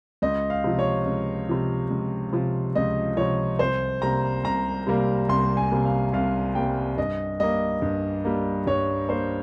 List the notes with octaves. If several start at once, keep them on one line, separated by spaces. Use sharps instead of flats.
C#2 D#5
F5
C3 F3
C#5
C#2
C3 F3
C#2
C3 F3
C#2 D#5
C3 F3 C#5
C2 C5
C3 G3 A#3 A#5
C2 A#5
C3 G3 A#3
C2 C6
G#5
C3 G3 A#3
F5
C2 F5
C3 G3 A#3 G5
G2 D#5
G3 A#3 D#5
G2
G3 A#3
G2 C#5
G3 A#3 C5